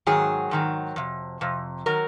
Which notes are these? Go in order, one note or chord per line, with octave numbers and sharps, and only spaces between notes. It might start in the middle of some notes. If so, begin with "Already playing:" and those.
G#2 D#3 F#3 G#4
G#2 D#3 F#3
F2 C3
F2 C3
D#3 F#3 A#4